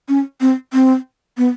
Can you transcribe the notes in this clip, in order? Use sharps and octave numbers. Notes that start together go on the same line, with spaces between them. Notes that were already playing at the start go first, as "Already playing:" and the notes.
C#4
C4
C4
B3